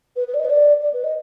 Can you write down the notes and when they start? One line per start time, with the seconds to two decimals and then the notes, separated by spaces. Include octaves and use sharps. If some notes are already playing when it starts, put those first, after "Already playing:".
0.16 B4
0.28 B4
0.34 D5
0.39 D#5
0.45 B4
0.50 D5
0.82 D5
0.94 B4
1.04 D#5